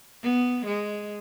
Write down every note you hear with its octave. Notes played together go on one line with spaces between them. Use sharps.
B3
G#3